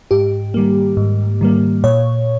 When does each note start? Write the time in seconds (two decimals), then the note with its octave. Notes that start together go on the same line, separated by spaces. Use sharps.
0.11 G#2 G4
0.54 D#3 G3 A#3
0.97 G#2
1.41 D#3 G3 A#3
1.84 A#2 C#5